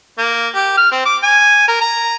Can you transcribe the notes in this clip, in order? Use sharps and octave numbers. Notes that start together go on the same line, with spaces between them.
A#3
G4
F6
C4
D6
G#5
A#4
A#5